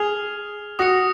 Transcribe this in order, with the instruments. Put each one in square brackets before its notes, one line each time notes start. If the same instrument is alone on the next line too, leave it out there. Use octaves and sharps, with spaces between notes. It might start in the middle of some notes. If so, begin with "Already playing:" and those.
Already playing: [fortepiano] G#4 [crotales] F6 F7
[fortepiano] F#4 [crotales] D#6 A#6 C#7